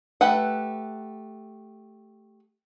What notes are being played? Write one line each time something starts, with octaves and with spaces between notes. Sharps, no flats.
A3 G4 B4 F#5